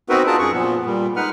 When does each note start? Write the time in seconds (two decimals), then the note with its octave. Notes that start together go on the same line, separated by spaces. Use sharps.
0.09 B3 C4 D#4 F#4 A#4 B4
0.27 D4 F4 G#4 A#4 A5
0.39 F#2 G#4 C#6
0.53 A#2 F3 B3
0.86 A#2 G3
1.16 G#3 D#4 B4 F#5 F6